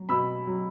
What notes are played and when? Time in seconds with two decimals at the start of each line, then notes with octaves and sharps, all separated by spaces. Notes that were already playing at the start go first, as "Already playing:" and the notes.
Already playing: F#3
0.09 B2 B5 E6
0.47 F#3